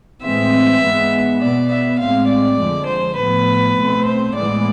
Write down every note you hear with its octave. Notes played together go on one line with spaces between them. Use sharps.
A2 E3 G#3 C4 E5
G#2 G#3 B3
B2 B3 D5
E5
A2 G#3 C4 F5
D5
F2 D3 F3 G#3
C5
A2 F3 B3 B4
B2 A3 C4
C5
A2 E3 G#3 B3 D5